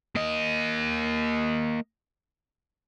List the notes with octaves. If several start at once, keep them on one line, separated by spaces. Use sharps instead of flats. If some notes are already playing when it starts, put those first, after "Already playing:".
A#3 D#5